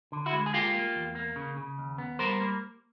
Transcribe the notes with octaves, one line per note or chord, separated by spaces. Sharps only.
D3
E4 F#4
G#3
G#4
A#3 F4 G4
A#3
E2
A#3
C#3
C#3
D#2
B3
G3 A#4 C5
A#3